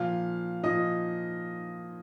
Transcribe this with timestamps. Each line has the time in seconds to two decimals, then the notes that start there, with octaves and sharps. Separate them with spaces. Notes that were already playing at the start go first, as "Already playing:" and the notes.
Already playing: A#2 F3 F5
0.63 A#2 F3 D#5